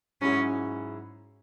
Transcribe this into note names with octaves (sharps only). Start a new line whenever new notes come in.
G#2 F#3 C#4 E4 G#4